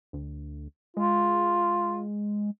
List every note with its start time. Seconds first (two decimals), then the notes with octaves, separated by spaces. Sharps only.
0.13 D2
0.97 G#3 F4